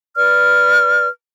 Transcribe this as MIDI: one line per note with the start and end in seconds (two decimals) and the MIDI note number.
0.15 1.07 71
0.15 1.07 74
0.15 1.07 89